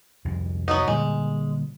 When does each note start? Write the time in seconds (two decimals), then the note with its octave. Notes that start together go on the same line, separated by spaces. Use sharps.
0.25 C2 F2 G#2
0.68 F#3 B3 D#4
0.88 A#2 D3 G3 G#3